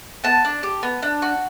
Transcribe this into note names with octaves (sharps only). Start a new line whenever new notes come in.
B3 A5
D4
G4
B3
D4
F#4